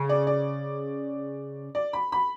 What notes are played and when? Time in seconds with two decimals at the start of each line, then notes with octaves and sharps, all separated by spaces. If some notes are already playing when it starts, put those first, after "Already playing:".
Already playing: C#3
0.09 D5
0.27 D5
1.75 D5
1.93 B5
2.12 B5